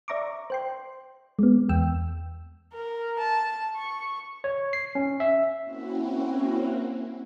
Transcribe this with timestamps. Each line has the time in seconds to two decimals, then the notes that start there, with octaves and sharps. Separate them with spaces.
0.08 D5 E5 A#5 C#6 D6
0.50 C5 G5 C6
1.39 G#3 B3
1.69 E2 G5 E6
2.73 A#4
3.18 A5
3.76 C#6
4.44 C#5
4.73 C7
4.95 C#4
5.20 E5
5.64 A#3 C4 C#4 E4 F#4